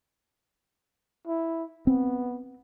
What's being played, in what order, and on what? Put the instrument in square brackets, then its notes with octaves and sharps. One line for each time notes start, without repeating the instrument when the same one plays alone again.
[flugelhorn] E4
[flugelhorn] B3 [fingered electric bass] C4